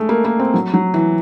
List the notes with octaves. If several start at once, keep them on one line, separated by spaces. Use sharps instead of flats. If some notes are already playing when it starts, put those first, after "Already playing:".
Already playing: G#3 A3
A#3
A#3
C4
F#3
F#3
E3